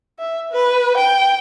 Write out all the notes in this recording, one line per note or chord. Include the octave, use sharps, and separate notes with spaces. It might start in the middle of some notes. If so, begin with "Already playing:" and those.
E5
B4
G5